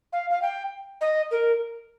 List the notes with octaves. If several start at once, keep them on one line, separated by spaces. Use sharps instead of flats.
F5
F5
G5
D#5
A#4